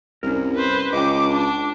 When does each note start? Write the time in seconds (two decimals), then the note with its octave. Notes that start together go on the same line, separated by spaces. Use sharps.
0.23 C2 C#4 A#4
0.56 B4 C5
0.93 C#2 D#5 G5 D6
1.28 D4